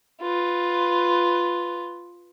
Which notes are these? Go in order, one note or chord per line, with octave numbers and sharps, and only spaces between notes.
F4 B4